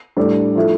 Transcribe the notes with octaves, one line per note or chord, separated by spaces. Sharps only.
A2 G3 D4 A4 D5
F3 A3 E4